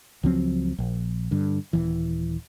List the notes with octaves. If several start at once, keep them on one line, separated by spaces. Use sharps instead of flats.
C#2 F3 F#3 C4
A#1
G2 D3
D#1 E3